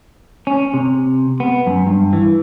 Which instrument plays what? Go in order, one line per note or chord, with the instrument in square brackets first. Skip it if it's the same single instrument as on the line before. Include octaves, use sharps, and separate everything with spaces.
[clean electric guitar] C#4
C3
B3
F#2
G2
E3